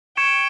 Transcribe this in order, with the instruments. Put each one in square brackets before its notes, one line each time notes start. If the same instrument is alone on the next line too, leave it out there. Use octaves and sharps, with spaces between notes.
[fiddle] G5 [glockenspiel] C#6 G#6 C#7 E7